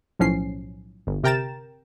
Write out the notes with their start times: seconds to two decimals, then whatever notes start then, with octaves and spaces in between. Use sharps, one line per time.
0.19 B1 A2 F3 C#4 C7
1.07 G1
1.24 C3 A#4 G5 A#5 A6 E7